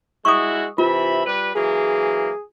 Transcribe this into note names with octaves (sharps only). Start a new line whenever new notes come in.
G#3 E4 F#4 C#6 D#6
C3 E3 F4 E5 B5
G3 B4
E3 F#3 A#3 G#4